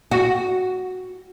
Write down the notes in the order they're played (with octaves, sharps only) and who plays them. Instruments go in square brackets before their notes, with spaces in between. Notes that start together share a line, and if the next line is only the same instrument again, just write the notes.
[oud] F#4